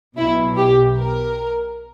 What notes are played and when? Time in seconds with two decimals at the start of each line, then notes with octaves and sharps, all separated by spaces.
0.17 B1 B2 E4
0.57 G4
0.99 A#4